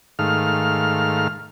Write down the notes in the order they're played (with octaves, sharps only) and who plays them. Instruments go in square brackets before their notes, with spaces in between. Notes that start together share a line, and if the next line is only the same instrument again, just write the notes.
[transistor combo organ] G#2 D#3 A3 F5 F6